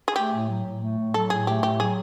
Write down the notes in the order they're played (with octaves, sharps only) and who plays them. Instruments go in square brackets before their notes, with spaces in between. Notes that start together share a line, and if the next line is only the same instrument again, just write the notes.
[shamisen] G#4
[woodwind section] A3 [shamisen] G4
[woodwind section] A2
F#3
A2
A3
A2
[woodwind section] F#3 [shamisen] A4
[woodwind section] A2 [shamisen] G#4
[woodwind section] A3 [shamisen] G4
[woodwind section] A2 [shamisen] G4
[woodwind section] F#3 [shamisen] G#4